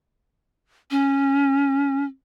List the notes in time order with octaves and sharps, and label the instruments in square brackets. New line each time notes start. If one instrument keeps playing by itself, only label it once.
[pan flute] C#4